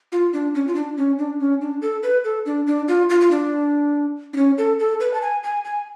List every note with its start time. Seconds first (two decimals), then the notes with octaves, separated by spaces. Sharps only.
0.12 F4
0.33 D4
0.55 C#4
0.67 F4
0.75 D4
0.97 C#4
1.19 D4
1.39 C#4
1.61 D4
1.82 A4
2.03 B4
2.24 A4
2.46 D4
2.67 D4
2.88 F4
3.10 F4
3.21 F4
3.31 D4
4.33 D4
4.36 C#4
4.58 A4
4.79 A4
5.00 B4
5.14 A5
5.22 G#5
5.43 G#5
5.65 G#5